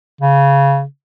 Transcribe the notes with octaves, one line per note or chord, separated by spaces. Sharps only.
C#3